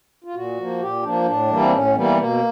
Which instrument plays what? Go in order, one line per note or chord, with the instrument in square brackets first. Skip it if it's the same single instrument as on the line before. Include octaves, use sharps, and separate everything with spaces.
[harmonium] F4
A#2 F#4
F3 A#3
A#2 G4
F3 A#3 D4
A2 D4
E3 G3 A#3
C4
A2 C#4
E3 G3 A#3 B3
B2 A#3